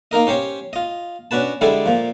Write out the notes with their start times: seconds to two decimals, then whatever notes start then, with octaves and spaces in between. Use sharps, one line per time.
0.11 A#3 D#4 A#4 D#5
0.27 C#4 G4 C5 C#5
0.73 F4 D#5
1.31 C#4 D4 F#4 B4 A5
1.61 D3 G3 G#3 E4 G#4 A4
1.86 A#2 F3